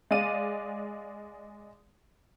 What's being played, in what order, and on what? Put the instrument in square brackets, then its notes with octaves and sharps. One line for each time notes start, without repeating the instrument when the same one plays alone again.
[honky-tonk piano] G#3 D5 F5 D#7